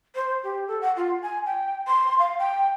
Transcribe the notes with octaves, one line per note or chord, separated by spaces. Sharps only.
C5
G4
A4
F#5
F4
G#5
G5
C6
F5
G5